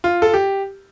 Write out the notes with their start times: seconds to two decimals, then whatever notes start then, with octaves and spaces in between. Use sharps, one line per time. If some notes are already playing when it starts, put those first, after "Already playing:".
0.04 F4
0.22 A4
0.34 G4